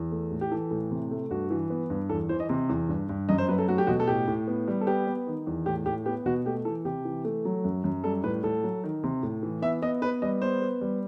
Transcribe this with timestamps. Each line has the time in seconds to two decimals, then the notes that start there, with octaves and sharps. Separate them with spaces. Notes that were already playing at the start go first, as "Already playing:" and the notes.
Already playing: E2
0.12 A3
0.32 A2
0.41 G4
0.51 E3 A4
0.71 A2
0.91 C3
1.11 A3
1.30 G2 F#4
1.50 E3
1.70 B3
1.90 G2
2.09 E2 A4
2.29 E3 C5
2.40 D#5
2.49 C3
2.69 E2
2.89 G2
3.09 G2
3.29 F#2 D#5
3.38 C5
3.48 F#3 B4
3.59 A4
3.68 A3 F#4
3.78 G4
3.87 B2 F#4
4.00 A4
4.07 A2 G4
4.28 A2
4.48 B3
4.68 G3
4.81 A4
4.87 B3 G4
5.07 B3
5.27 D#3
5.47 E2
5.66 A2 G4
5.86 A2 G4
6.06 B3 G4
6.26 B2 F#4
6.45 A3 G4
6.65 E3 A4
6.85 C3 G4
7.05 E3
7.25 A3
7.45 F#3
7.64 F#2
7.84 F#2
8.04 G3 A4
8.24 A2 B4
8.43 A2 A4
8.63 F#3
8.84 D#3
9.03 C3
9.23 A2
9.43 E3
9.62 B3 E5
9.82 B3 D#5
10.02 B3 B4
10.22 G3 D#5
10.42 B3 C5
10.62 B3
10.81 G3